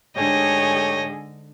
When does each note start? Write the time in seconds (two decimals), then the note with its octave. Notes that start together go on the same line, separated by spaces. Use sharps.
0.17 G#2 D3 A3 G4 G#4 C#5 D#5